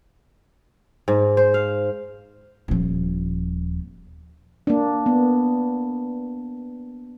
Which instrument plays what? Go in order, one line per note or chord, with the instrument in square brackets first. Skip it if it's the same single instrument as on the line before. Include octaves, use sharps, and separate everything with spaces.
[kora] G#2
C5
F5
[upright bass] D#1 F3
[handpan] A#3 D4
B3